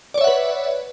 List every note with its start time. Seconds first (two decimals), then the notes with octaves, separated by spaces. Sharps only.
0.14 D5
0.18 C#5
0.21 E5
0.24 F#5
0.27 B4